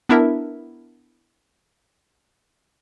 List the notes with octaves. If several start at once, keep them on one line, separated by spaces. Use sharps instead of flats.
B3 D4 E4 A#4 E5